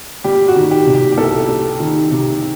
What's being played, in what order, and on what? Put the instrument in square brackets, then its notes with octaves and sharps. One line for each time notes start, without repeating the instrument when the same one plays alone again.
[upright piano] G3 G4
F#4
D#3
G4
C3
G4
G4
C2 A4
G3
D#3
C3